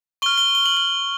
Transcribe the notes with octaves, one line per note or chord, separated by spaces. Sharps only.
C#6 F6 G7
G7
G7
F#7
G7